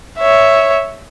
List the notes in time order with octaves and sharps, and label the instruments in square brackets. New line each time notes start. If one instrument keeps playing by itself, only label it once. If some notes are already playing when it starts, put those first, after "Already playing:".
[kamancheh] C#5 E5